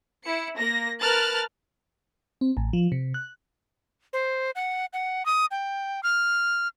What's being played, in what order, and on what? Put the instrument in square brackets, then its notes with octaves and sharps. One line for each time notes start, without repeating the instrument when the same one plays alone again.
[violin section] E4 C#7
A#3 A#6
A#4 B4 A5 F6 F#6 A6
[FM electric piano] C4
A1
F3
C3
F#6
[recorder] C5
F#5
F#5
D#6
G5
F6